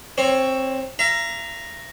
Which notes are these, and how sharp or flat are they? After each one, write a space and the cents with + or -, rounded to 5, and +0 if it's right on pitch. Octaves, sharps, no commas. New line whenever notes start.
C4 +15 C#5 +0
E5 +45 A#5 +0